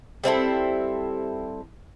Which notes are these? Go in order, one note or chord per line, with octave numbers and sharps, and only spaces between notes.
G3 C4 E4 A4